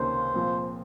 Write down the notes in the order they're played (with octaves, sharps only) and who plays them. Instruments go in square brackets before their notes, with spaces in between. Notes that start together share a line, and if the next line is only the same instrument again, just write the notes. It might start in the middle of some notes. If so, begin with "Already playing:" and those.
Already playing: [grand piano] C#2 C3 D#3 A#3 C#4 [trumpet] C5
[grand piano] A#2 F3 C4